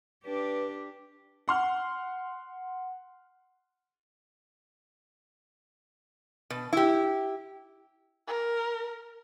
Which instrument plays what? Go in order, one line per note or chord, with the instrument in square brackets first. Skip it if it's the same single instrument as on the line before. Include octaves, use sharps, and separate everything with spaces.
[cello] D4 G4 [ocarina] B4
[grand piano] F#5 C6 F6
[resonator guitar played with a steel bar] B2
E4 G4
[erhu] A#4